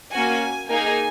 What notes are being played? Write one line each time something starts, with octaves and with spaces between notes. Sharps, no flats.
A#3 C#4 F#4 G#5
A#3 D#4 G#4 G#5